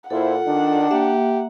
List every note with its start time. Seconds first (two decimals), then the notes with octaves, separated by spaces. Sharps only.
0.10 A#2 E4 F4 A4 C5 F#5
0.47 D#3 D4
0.91 A#3 G4 E5